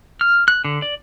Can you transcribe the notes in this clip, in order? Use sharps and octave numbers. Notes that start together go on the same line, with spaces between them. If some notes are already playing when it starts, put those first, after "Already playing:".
F6
F#6
D3
D5